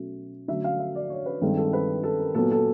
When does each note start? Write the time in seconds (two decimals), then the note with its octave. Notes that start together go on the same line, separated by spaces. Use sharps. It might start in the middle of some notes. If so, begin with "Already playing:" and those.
Already playing: B2 F#3 A3 C#4
0.48 D3 F#3 A3 E5
0.64 F5
0.79 E5
0.95 D5
1.10 C#5
1.26 B4
1.42 G2 D#3 G#3 C4 A4
1.57 A4
1.73 B4
2.03 A4
2.20 A#4
2.35 A#2 F#3 B3 A4
2.51 A4